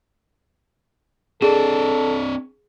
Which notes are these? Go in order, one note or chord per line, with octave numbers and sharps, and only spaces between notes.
C4 D4 G#4 A4 D5